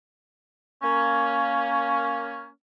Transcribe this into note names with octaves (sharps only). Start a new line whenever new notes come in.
A#3 C#4